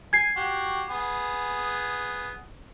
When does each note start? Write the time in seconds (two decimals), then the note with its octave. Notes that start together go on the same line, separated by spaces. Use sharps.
0.13 G#5 G#6 C7
0.36 F#4 G4
0.89 B3 G#4